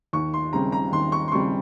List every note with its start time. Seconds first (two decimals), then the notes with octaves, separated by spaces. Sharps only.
0.13 D#2 C#6
0.34 C6
0.53 C#3 G3 C4 A#5
0.72 A#5
0.92 D#2 C6
1.12 C#6
1.28 C6
1.32 C#3 G3 C4 C#6